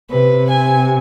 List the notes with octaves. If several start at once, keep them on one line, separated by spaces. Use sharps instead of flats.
C3 B4
G#5